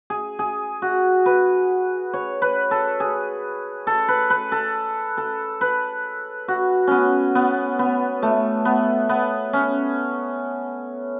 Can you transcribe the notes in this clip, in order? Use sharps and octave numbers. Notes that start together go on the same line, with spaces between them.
G#4
G#4
F#4
B4
C#5
B4
A4
G#4
A4
B4
B4
A4
A4
B4
F#4
B3 C#4
B3
B3
A3
B3
B3
C#4